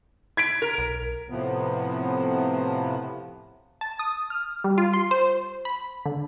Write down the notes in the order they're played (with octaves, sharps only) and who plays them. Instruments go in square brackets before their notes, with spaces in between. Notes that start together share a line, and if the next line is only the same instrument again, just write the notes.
[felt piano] G#6 B6 D7
[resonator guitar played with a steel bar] A#4
[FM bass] B1
[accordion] A2 C3 F3 B3
[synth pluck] A5
D#6
F6
G3
F4
C6
C5
B5
D3